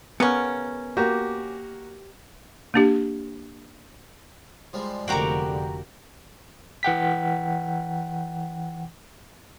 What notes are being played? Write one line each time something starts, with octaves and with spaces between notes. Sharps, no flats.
C#3 B3 C#4 A#4
A#3 F#4 G4
A#3 D4 G4
F3 G3 G#3
F1 D3 A#3 F#4 G4 G5 A#5 C#6
E3 F#5 G5 B6